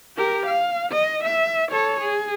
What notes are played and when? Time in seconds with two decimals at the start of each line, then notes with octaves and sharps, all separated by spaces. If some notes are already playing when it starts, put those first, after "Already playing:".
0.17 G4 A#4
0.46 F5
0.92 D#5
1.24 E5
1.71 A4 C#5
2.00 G#4